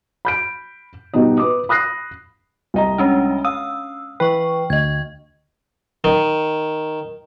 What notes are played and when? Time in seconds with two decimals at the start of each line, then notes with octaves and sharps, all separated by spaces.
0.25 B5 G6 D7
1.14 B2 G3 B3 D#4 D#5
1.38 B4 D6 D#6
1.69 B5 D#6 F#6 A#6 C7
2.74 C2 D#5 A#5
2.98 G#3 C#4 D4
3.45 F5 D#6 E6
4.20 E3 B4 G5 C#6
4.70 D2 D#5 G#6
6.04 D#3